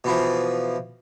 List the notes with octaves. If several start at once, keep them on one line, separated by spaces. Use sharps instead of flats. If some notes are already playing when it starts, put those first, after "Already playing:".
B2 E3 F3